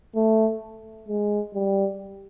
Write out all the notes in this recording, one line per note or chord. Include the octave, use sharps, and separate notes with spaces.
A3
G#3
G3